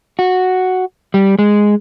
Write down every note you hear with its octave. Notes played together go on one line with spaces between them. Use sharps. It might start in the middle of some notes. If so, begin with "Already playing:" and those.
F#4
G3
G#3